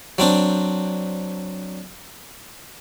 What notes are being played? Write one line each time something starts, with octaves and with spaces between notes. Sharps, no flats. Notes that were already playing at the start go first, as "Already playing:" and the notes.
F#3 C4 D4